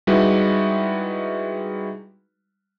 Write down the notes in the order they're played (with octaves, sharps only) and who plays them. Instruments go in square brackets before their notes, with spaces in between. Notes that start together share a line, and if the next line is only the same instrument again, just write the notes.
[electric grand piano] G3 G#3 D#4 E4 F#4 B4